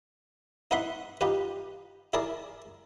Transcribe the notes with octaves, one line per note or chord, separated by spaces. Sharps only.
D#4 E4 B4 F#5 B5 C6
D#4 F4 G4 B4
E4 G#4 A#4 D5 A5